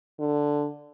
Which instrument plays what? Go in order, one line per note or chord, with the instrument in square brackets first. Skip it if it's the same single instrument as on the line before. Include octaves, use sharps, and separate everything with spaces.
[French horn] D3